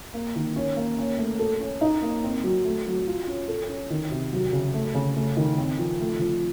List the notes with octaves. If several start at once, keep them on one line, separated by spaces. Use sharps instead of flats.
A#3
D#3
C#4
A#3
C#4
A3
A4
C#4
D#4
A#3
C4
F#3
A3
F#3
F4
C#4
A4
C#4
D#3
C3
F#3
C#3
A3
C#3
A3
D#3
C4
F3
A3
F3